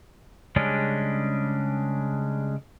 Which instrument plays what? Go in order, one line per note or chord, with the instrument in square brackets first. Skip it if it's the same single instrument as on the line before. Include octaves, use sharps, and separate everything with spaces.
[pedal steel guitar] C#3 G3 G#3 C#4 D4